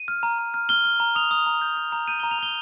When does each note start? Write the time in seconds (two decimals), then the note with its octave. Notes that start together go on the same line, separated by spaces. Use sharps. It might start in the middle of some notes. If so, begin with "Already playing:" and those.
Already playing: D#7
0.08 F6
0.23 A#5
0.39 A#5
0.54 F6
0.69 F6 G7
0.85 F6
1.00 A#5
1.15 D#6 F7
1.31 D#6
1.46 A#5
1.61 G6
1.77 D#6
1.92 A#5
2.07 G6 D#7
2.20 A#5 G7
2.31 F7
2.38 A#5 G7